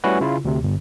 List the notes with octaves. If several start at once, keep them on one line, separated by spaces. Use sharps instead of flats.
G3 A3 C#4 E4 F#4 B4
C#3 E4 F4
D2 C3
G1